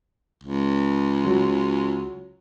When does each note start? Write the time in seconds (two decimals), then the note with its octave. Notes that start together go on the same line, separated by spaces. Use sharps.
0.43 C#2
1.24 F#3